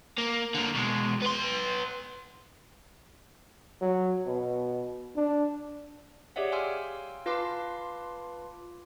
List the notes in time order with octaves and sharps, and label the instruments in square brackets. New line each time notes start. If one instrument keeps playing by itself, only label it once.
[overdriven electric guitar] A#3
D3 A#3
B2 G#3
B3 C6
[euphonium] F#3
B2
D4
[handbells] G4 G#4 C#5 D5 E5 F#5
F5 G5 G#5 C6 E6 F6
F4 B4 F5 A5 C6 D6